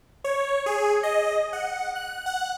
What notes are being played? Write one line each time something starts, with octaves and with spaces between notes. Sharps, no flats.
C#5
G#4
D#5
F#5
F#6
F#5